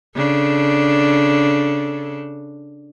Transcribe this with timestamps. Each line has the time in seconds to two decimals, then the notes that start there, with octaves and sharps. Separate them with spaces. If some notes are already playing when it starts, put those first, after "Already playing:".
0.16 C#3 D4 A4